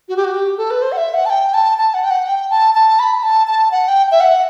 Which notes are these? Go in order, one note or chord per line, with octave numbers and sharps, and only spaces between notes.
F#4
G4
F#4
G4
A4
B4
C5
F#5
E5
F#5
A5
G5
A5
A5
F#5
G5
F#5
G5
A5
A5
B5
A5
A5
F#5
G5
E5
F#5